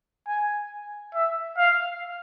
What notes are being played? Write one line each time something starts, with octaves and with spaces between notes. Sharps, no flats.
G#5
E5
F5